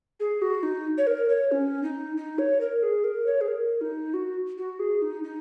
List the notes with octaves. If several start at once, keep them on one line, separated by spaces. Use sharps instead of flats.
G#4
F#4
D#4
C#5
A#4
C#5
C#4
D#4
D#4
C#5
A#4
G#4
A#4
C#5
G#4
A#4
D#4
F#4
F#4
G#4
D#4
D#4